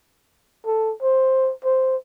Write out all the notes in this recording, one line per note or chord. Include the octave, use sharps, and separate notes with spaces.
A4
C5
C5